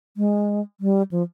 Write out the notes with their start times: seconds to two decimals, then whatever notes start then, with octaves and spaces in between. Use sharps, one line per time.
0.17 G#3
0.81 G3
1.11 F3